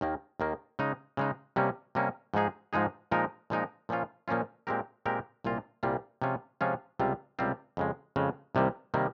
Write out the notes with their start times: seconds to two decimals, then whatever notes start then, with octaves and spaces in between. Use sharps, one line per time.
0.01 D#2 D#3 A#3
0.40 D#2 D#3 A#3
0.79 C#3 G#3 D#4
1.17 C#3 G#3 D#4
1.56 C3 G3 A#3 C#4
1.95 C3 G3 A#3 C#4
2.34 G#2 F3 G#3 D#4 G#4
2.73 G#2 F3 G#3 D#4 G#4
3.11 A#2 F3 G#3 D#4 A#4
3.50 A#2 F3 G#3 D#4 A#4
3.89 A#2 F3 A#3 C#4 F4
4.28 A#2 F3 A#3 C#4 F4
4.67 A#2 G#3 C4 G4 A#4
5.06 A#2 G#3 C4 G4 A#4
5.44 C2 A#2 G3 A#3 F4
5.83 C2 A#2 G3 A#3 F4
6.22 C3 F3 G#3 C#4 F4
6.61 C3 F3 G#3 C#4 F4
6.99 C#2 C3 G3 C4 F4
7.39 C#2 C3 G3 C4 F4
7.77 F2 C#3 G#3
8.16 F2 C#3 G#3
8.55 C2 C3 D#3 G3 A#3
8.94 C3 D#3 G3 A#3